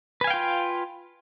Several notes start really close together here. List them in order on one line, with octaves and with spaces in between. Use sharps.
B4 G#5 F5 G5 F4